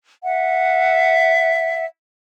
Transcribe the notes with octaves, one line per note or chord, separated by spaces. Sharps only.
E5 F#5